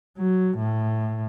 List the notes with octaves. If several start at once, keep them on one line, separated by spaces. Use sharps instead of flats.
F#3
A2